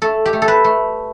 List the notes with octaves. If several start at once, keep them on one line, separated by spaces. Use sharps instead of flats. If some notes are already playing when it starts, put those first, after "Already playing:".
A3 A4
G4
A3
A4
B4
A3